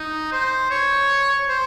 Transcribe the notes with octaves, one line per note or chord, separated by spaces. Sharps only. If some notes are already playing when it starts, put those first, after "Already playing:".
Already playing: D#4
C5
C#5
C5